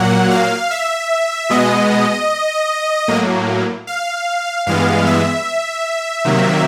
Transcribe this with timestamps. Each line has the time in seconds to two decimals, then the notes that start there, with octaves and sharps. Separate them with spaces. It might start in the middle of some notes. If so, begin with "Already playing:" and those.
Already playing: A#2 F#3 A#3 F#5
0.31 F5
0.71 E5
1.49 B2 G#3 B3 D#5
3.08 A2 F#3 A#3
3.87 F5
4.67 G2 E3 G#3 B3 F5
5.06 E5
6.25 C3 D#3 F#3 A#3